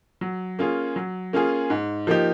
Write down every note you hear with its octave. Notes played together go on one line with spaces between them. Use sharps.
F#3
A#3 C#4 F4 G#4
F#3
A#3 C#4 F4 G#4
G#2
F3 A#3 D#4 G4